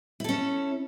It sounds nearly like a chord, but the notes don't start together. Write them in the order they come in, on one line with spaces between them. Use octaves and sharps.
E4 A4 C#4